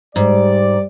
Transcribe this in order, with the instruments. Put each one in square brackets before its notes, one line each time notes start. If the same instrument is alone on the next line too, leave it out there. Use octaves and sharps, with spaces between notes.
[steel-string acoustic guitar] G#2 [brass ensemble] G3 D5